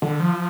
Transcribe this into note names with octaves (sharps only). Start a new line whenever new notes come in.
D3
F3